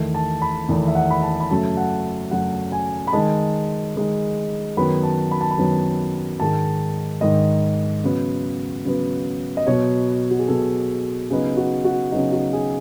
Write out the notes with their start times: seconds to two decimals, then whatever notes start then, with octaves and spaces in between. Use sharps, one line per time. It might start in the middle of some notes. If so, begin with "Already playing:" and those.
Already playing: E2 D#3 A3
0.14 A5
0.42 B5
0.69 E2 D#3 A3
0.88 E5
0.95 F#5
1.11 B5
1.22 A5
1.40 B5
1.51 F#2 C#3 F#3 A3 A5
1.77 F#5
2.31 F#2 C#3 F#3 A3 F#5
2.72 G#5
3.07 B5
3.13 D#3 G#3 D#4 A5
3.95 D#3 G#3 D#4
4.77 F#2 D#3 F#3 B3 B5
5.03 A5
5.31 B5
5.41 A5
5.51 B5
5.58 F#2 D#3 F#3 B3
6.40 G#2 D#3 G#3 A5
7.21 G#2 D#3 G#3 D#5
8.04 C#3 F#3 B3
8.85 C#3 F#3 B3
9.57 D#5
9.67 B2 F#3 B3 C#5
10.31 F#4
10.39 G#4
10.48 B2 F#3 B3 A4
11.30 C#3 F#3 B3 D#4 G#4
11.57 F#4
11.84 F#4
12.12 C#3 F#3 B3 D#4 G#4
12.32 F#4
12.53 G#4